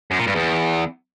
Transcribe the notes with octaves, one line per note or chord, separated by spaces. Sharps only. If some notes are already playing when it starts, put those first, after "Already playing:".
F#2
A#2
G2
E2